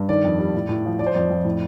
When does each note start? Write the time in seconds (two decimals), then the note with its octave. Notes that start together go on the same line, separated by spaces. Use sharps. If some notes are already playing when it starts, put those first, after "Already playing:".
Already playing: G2
0.09 D#3 D5
0.24 F2
0.39 G3
0.54 A2
0.69 A2
0.85 F3
0.99 F3 D5
1.06 C5
1.15 F2 D5
1.30 F2
1.45 A2